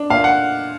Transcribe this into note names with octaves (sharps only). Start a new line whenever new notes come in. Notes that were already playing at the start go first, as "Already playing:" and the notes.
Already playing: D4
A#2 F5
F#5